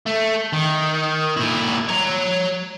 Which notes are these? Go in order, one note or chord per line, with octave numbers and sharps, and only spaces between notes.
A3
D#3
A#2 E4
C#5 A#5